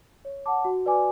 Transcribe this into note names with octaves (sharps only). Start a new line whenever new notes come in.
C#5
F#5 A5 D6
F#4
B4 D5 G#5 D6